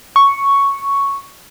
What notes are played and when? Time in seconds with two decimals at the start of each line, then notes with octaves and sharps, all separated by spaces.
0.16 C#6